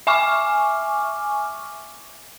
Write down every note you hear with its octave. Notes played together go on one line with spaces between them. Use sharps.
E5 G#5 C#6 D6 F6